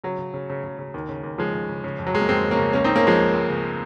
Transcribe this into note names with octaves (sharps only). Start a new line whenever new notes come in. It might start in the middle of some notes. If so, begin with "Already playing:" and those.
C#3 F#3
C#3
C#3
C#3
C#3
C#3
D#2
C#3
D#2
C#3 F3 G#3
C#3
C#3
C#3
F2
F#3
F2 G#3
A#3
F2 G#3 C4
C#3
A#3 C#4
C#3
C#2 A#3 C#4
C4 D#4
C#3
A#3 C#4
C#2 F3 G#3
C#2
C#2
C#3